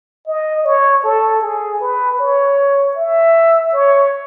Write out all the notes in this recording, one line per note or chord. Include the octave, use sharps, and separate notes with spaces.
D#5
C#5
A4
G#4
B4
C#5
E5
C#5